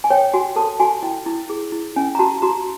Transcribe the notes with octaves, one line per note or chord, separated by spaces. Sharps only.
G#5
C#5 G5
F#4 G#5
A4 A5
F#4 G#5
E4 G5
E4
G#4
E4
C#4 G#5
A#5
F#4 A5
F#4 A#5